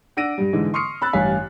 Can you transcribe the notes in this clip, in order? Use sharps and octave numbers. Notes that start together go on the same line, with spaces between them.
D4 F#5 E6 A#6 D7 D#7
G2 G3
G#2 D3 E3 G#3
C6 C#6 D#6 F6 C7 C#7
B5 E6 F#6 A6
A1 G2 F5 G#5 B6